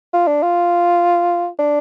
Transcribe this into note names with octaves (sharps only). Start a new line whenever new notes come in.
F4
D4
F4
D4